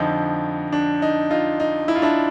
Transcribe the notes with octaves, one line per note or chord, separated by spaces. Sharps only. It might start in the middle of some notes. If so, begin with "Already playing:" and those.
Already playing: F2 D3 F3 D#4
D4
D#4
D#4 F4
D#4
E4
F4
D4 E4